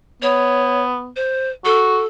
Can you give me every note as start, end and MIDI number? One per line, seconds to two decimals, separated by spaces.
0.22 1.10 59
0.22 0.83 73
1.16 1.50 72
1.65 2.01 66
1.65 2.06 69